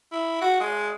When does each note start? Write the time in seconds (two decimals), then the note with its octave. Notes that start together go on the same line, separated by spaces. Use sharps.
0.12 E4
0.41 F#4
0.60 G#3